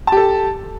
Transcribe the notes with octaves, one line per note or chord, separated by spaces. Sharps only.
G4 A4 A5